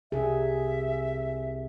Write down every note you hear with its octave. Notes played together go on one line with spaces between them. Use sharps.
C2 G#4 E5